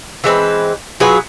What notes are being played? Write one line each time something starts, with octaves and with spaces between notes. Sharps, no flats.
E3 G#3 C4 B4
F#3 F4 G#4 B4